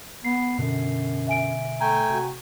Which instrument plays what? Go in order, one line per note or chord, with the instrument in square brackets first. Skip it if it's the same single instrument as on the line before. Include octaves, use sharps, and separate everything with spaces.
[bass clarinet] B3 [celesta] C7
[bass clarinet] F#2 [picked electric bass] B2 D3
[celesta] E5 G#5 D7
[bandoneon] A3 G5 G#5 [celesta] A#5
[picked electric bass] C3 [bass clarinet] F#4